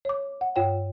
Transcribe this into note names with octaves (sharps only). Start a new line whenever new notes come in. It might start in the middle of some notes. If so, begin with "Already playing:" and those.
C#5 D6
F#5
G2 F4 C#5 G5